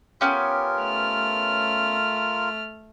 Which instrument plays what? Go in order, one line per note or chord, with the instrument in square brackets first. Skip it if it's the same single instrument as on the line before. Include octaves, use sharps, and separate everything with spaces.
[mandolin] B3 C#4 G4 [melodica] F4 A#4
[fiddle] A3 F6